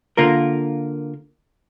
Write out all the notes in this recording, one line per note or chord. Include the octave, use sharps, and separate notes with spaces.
D3 A#3 F4 A#4